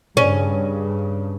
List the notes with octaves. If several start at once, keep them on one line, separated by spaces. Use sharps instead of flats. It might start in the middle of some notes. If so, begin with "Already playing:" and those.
G2 C#3 C#4